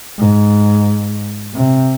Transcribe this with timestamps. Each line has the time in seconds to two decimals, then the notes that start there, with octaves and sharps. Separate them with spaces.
0.19 G#2
1.54 C3